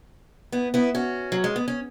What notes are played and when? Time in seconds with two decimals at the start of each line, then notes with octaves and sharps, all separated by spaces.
0.52 B3 E4
0.74 B3 E4
0.95 C#4 F#4
1.32 F#3
1.44 G#3
1.56 B3
1.68 C#4